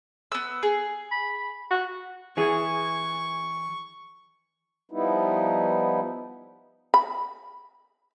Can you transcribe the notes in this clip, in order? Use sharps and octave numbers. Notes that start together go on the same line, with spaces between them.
B3 E6
G#4
B5
F#4
E3 G#4 C#6
F3 G3 B3 D#4 E4
B5